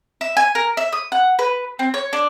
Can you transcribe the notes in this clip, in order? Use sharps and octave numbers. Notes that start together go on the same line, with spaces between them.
E5
G#5
A#4
E5
D#6
F#5
B4
C4
C#5
D4